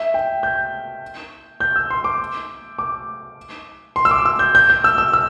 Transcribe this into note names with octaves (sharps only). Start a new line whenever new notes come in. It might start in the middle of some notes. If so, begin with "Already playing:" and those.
Already playing: E5
G5
G6
G6
E6
C6
D6
D6
C6
E6
D6
E6
G6
G6
G6
E6
E6
E6